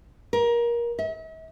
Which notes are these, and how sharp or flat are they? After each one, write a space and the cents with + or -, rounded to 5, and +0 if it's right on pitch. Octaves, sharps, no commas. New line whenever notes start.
A#4 +20
E5 -45